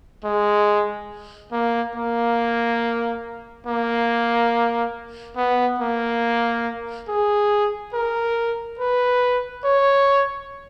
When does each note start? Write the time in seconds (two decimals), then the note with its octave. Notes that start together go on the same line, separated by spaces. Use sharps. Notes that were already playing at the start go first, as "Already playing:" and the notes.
0.24 G#3
1.52 A#3
1.95 A#3
3.67 A#3
5.36 B3
5.80 A#3
7.08 G#4
7.94 A#4
8.79 B4
9.64 C#5